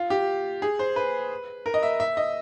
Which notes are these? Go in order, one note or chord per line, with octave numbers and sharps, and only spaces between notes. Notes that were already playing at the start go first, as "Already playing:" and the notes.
Already playing: F4
G4
G#4
C5
B4
A#4
D#5
E5
E5
D#5